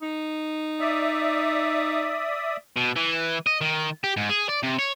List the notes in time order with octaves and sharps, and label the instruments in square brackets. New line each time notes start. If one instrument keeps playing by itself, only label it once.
[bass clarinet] D#4
[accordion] D5 E5 D#6
[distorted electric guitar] B2
E3
D#5
D#3
G4
G#2
G#4
D5
C3
C#5